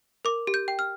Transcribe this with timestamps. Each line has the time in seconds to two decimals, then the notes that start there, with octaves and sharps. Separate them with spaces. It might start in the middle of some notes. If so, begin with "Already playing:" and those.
0.25 A#4 D6
0.47 G4
0.54 G6
0.68 G5
0.79 F6